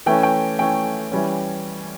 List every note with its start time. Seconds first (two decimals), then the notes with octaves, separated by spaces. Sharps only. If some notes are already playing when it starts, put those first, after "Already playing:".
0.06 E3 A3 C#4 G5
0.23 G5
0.59 E3 A3 C#4 G5
1.12 E3 G3 C#4